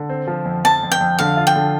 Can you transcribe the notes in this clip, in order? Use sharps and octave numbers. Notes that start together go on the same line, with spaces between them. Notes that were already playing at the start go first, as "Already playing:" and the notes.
Already playing: D3
C4
F3
F2
F2 A5
F2
G5
F2
D3 F5
F4
G5
D3